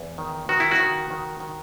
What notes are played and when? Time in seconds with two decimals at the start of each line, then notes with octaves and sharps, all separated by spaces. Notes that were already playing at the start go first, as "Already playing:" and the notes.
Already playing: E2
0.18 D#3
0.49 D#3 F#4
0.60 E4
0.71 F#4
0.80 D#3
1.11 D#3
1.40 D#3